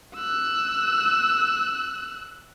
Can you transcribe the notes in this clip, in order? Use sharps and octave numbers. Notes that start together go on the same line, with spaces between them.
E6 F#6